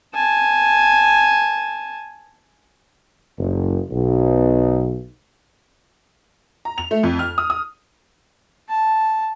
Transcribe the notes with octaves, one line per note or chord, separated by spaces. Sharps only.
G#5 A5
F#1
B1
A#5
F7
A3
F2
F6
D#6
D#6
A5